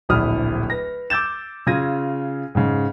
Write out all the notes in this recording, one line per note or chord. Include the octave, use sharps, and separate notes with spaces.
D1 A#1 E4 D#6 F6
B4 A#6
D6 E6 G6 A6 E7
C#3 F4 G#6 A#6 D#7
G#2 C#3